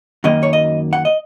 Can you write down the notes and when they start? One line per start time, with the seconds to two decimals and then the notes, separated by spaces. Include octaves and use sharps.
0.24 F#2 D#3 F#3 A#3 D#5
0.43 C#5
0.53 D#5
0.93 F#5
1.05 D#5